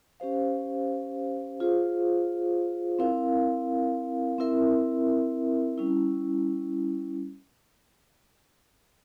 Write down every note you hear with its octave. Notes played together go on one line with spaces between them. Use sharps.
C#4 G4 C5 F5
F4 G#4 C5 F5
C4 E4 A#4 F5
C4 E4 A#4 E5
G3 C#4 E4